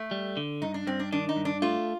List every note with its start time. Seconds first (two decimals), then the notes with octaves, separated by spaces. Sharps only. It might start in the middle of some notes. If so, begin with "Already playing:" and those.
Already playing: A3
0.11 G3
0.37 D3
0.62 G2 D#4
0.74 D4
0.87 G2 C4
0.99 D4
1.12 D#3 D4
1.29 D#4
1.36 G2
1.45 D4
1.62 A3 F4